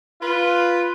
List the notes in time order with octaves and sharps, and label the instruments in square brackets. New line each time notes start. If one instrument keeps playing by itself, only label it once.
[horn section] F4 B4